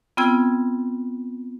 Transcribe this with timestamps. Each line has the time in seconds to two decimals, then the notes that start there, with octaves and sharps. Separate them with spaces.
0.17 B3 C4 F4 G5 E6 G#6